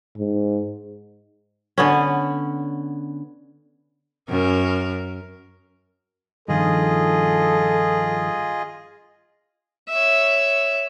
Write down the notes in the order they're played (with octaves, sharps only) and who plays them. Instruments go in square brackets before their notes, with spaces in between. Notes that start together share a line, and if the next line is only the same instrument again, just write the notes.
[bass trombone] G#2
[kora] D3 B3 C#4
[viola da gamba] F#2 A#4
[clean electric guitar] G2 D#3 F3 [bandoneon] F4 G#4 D#5 [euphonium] A4
[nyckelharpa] C#5 E5